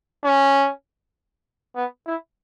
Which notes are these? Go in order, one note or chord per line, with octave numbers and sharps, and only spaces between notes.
C#4
B3
E4